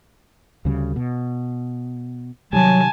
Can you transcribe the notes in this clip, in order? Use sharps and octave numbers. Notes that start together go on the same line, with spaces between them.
D2 C#3 G3
B2
C3 D#3 F#3 G3 G#5 A5